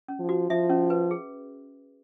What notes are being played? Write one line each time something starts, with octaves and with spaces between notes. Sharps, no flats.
C#4
F3
F#4
F3 E5
C#4
B4
G#4